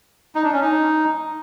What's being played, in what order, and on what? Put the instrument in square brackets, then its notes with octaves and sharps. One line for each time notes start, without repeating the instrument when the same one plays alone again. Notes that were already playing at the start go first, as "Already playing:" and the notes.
[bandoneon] D#4
D4
C#4
D#4